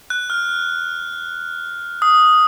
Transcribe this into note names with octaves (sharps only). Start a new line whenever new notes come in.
F#6
F6
D#6